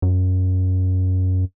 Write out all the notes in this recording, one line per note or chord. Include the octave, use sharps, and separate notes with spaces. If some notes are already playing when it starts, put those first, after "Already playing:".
F#2